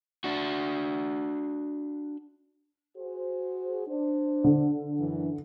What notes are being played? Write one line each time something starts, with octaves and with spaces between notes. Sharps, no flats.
D4 F#4
F#4 G#4 C5
D4 C5
D3
F#2 E3